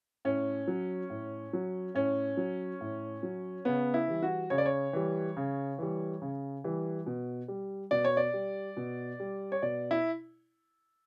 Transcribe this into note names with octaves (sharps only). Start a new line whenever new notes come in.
A2 C#4
F#3
A2
F#3
A2 C#4
F#3
A2
F#3
C#3 B3
E4
E3 G3
F#4
C#3 C#5
D5
C#5
E3 G3
C#3
E3 G3
C#3
E3 G3
B2
G3
B2 D5
C#5
D5
G3
B2
G3
C#5
B2 D5
E4